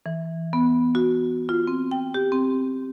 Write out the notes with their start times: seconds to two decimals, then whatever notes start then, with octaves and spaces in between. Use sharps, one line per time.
0.06 E3
0.53 B3
0.95 F#4
1.49 F4
1.67 C4
1.91 G5
2.14 G4
2.32 C4